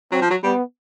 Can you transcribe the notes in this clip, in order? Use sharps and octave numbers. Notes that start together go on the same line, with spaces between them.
F#3 C4
F3
F#3
G3 B3